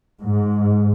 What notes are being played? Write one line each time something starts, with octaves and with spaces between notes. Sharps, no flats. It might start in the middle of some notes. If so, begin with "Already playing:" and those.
G#2